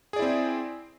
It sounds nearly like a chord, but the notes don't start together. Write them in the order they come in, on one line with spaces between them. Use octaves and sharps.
G#4 D5 E4 C4